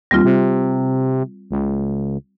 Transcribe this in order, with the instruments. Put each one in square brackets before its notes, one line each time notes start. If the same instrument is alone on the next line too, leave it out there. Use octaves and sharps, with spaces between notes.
[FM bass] D#2 [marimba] G3 C4 F4
[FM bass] C3
C#2